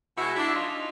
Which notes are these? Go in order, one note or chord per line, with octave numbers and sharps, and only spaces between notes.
B2 G#3 E4 F#4
D4 E4
D#4 F4